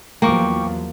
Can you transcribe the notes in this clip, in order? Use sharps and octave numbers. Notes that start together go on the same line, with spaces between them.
E2 F3 F#3 A#3 G5 C#6 D6